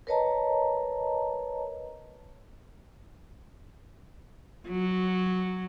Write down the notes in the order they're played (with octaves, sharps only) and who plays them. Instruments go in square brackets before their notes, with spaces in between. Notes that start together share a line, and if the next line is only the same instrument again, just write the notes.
[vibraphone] A#4 B4 C#5 D#5 A5 A#5
[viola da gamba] F#3